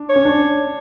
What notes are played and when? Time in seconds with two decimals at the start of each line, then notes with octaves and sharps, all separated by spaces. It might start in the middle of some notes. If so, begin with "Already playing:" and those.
Already playing: D4
0.09 C#5
0.16 C#4
0.25 D4